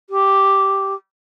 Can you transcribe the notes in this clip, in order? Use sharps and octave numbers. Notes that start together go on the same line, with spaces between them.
G4